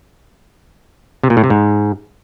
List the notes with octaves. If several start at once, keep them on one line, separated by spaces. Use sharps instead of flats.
C3
A#2
A2
C3
G#2